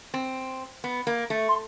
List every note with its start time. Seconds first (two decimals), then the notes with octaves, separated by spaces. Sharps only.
0.14 C4
0.84 B3
1.07 A#3
1.30 A3
1.48 C6